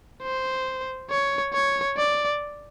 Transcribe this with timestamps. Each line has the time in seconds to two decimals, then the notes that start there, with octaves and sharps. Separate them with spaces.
0.23 C5
1.10 C#5
1.53 C#5
1.97 D5